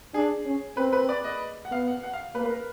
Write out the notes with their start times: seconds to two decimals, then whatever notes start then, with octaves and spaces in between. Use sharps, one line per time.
0.14 D4 G#4
0.46 C#4
0.77 C4 B4
0.93 B4
1.09 D5
1.24 D#5
1.65 F#5
1.71 B3 F5
1.88 F#5
2.03 F#5
2.14 F5
2.35 A#3 B4
2.45 B4
2.50 A#4